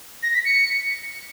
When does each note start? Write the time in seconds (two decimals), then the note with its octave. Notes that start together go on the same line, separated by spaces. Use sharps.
0.23 A#6
0.34 B6
0.45 C#7